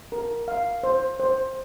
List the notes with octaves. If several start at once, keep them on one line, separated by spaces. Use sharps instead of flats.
A#4
F5
C5
C5